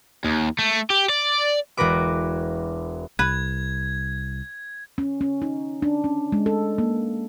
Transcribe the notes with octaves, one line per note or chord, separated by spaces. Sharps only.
D#2
A3
G4
D5
E1 F#4 A#4 B4 D6
C2 B4 G#6
C#4
C#4
D#4
D4
C#4
G#3
A4
A#3